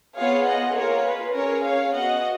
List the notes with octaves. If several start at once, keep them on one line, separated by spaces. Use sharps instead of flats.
B3 F4 G#4 C#5 F5
D#5 F#5
A#3 F4 G#4 A#4 C#5
B4
C#4 G#4 A#4 C#5
C#5 F5
B3 F#4 D#5 F#5